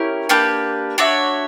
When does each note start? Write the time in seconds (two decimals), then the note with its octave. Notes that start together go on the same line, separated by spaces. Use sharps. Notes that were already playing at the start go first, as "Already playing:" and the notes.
Already playing: C#4 E4 G4 A#4
0.29 A#3 D4 G4 B4
0.98 D4 F#4 C#5 E5